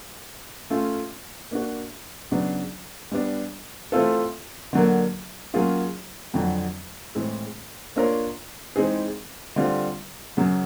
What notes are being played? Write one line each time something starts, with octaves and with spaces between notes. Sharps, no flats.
A3 C#4 F4
A#3 D4 F#4
C#3 F#3 B3 D4
G3 B3 D4
E3 A3 C4 F4 A4
D3 F#3 A#3
F#3 A#3 C#4 F4 G#4
F2 D3 F#3
A2 E3 G#3 C4
A#3 D4 F4 A#4 C#5
E3 G#3 C4 D#4 G#4
D3 G3 C4 F4
F#2 C#3 F#3